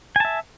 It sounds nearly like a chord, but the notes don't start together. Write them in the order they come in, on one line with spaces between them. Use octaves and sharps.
G#5 A5 E5